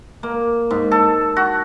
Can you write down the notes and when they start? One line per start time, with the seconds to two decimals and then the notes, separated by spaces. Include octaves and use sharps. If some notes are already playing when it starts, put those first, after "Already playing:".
0.23 A#3
0.70 G#2
0.91 A4
1.36 F#4